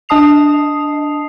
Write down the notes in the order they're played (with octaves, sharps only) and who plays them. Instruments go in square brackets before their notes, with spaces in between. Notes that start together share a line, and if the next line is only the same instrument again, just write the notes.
[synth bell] D4 D#5 A5 D#6 C7 F7